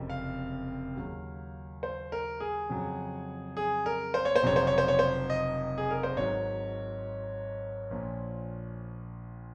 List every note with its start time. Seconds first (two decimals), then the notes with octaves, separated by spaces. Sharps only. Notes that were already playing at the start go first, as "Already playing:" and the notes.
Already playing: F#1 F2 C3
0.10 F5
0.96 D#2 C#3 F#3
1.83 C5
2.12 A#4
2.40 G#4
2.69 F2 C#3 F#3
3.57 G#4
3.86 A#4
4.14 C5
4.25 C#5
4.36 C5
4.43 F1 F2 C#3 F#3 C#5
4.56 C5
4.67 C#5
4.78 C5
4.88 C#5
4.99 C5
5.30 D#5
5.78 G#4
5.91 A#4
6.03 C5
6.17 G#1 G#2 F#3 C#5
7.91 A#1 A#2 F3